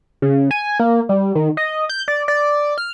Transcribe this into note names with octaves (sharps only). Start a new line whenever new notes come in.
C#3
G#5
A#3
G3
D#3
D#5
G6
D5
D5
F6